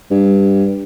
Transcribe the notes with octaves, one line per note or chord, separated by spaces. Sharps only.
G2